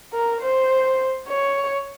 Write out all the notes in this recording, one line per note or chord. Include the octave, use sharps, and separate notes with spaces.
A#4
C5
C#5